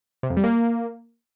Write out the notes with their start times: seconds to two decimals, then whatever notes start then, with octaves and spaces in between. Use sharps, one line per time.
0.23 C3
0.30 F2
0.37 G3
0.44 A#3